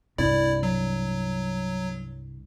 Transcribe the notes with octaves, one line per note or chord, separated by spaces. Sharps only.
C2 G2 E4 D5
F#3